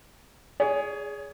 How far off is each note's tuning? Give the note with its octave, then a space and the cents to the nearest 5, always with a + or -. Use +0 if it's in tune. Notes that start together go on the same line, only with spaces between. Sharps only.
G#4 +0 C#5 +35